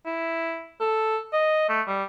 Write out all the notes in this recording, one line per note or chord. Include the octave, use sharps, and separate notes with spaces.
E4
A4
D#5
A3
G3